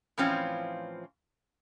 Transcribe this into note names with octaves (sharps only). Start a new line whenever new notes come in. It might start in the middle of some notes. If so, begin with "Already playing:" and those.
A2 E3 F3 C4 C#4 F4